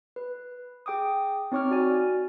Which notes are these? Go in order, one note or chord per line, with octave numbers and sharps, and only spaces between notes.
B4
G#4 G5 D6 D#6
C4 D#4 C#5 C#6 D6 F6
F#4 D5 G#5